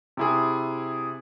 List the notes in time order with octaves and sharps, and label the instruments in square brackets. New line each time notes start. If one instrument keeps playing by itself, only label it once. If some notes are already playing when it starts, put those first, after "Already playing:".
[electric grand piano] C3 E4 G#4